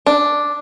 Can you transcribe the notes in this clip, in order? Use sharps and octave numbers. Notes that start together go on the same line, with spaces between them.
D4